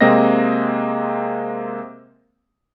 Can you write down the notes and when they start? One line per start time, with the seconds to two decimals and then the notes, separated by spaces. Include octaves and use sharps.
0.01 C3 G#3 A#3 C4 D#5 A#6